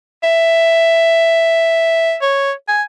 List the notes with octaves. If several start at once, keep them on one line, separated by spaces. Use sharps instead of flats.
E5
C#5
G#5